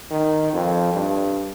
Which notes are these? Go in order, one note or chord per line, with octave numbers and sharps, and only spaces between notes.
D#3
F2
G2